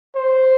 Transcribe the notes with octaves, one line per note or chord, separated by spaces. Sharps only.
C5